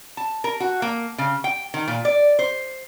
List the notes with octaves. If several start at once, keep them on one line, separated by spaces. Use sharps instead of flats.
A5
A#4
F#4
A#3
C#3
G5
D#3
A#2
D5
C5